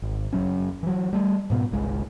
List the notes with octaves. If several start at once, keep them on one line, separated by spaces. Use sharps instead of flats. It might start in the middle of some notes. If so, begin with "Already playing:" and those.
G#1
F#1 F#2 F#3 C#4
E3 F#3
G3 A3
G#2 B2 B3
G1 C2 G#3